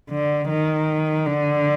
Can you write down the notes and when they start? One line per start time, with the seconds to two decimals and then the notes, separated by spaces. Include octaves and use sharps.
0.10 D3
0.49 D#3
1.26 D3